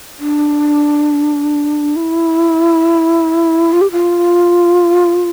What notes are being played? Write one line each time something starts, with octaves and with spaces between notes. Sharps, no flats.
D4
E4
F4
G4
F4